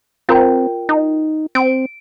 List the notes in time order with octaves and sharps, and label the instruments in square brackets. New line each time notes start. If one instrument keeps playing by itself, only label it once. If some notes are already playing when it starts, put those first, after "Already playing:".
[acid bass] C4 [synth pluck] F4 A#4 G5
[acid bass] D#4
[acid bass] C4 [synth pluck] D7